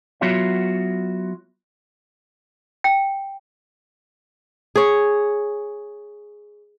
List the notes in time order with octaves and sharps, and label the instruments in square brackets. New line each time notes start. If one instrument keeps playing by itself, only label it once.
[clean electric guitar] F#3 B3 F4 F#4 C#5 E5
[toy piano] G5
[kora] G#4 C#5